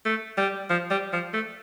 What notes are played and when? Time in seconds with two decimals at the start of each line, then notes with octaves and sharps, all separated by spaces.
0.06 A3
0.37 G3
0.70 F3
0.91 G3
1.13 F3
1.33 A3